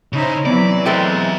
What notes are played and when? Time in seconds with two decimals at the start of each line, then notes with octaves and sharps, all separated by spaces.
0.13 C#3 D#4 E4 C5
0.46 C3 E3 F#3 B3 D5
0.86 G#3 A3 C4 F#4 E5